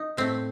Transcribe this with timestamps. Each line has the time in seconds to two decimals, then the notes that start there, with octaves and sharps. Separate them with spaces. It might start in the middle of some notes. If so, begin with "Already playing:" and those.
Already playing: D#4
0.17 A2 A3 C4